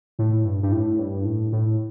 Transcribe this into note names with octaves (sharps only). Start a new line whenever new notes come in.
A2
G2
G2
A2
G2
A2
A2